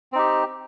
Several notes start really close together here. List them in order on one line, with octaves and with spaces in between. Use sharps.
C4 D#4 G4